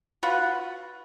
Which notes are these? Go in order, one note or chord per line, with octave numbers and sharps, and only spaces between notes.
F4 F#4 B4 F#5